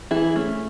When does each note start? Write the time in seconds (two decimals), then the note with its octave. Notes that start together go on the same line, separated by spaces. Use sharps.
0.11 E3 E4 G#4
0.36 A3 C#4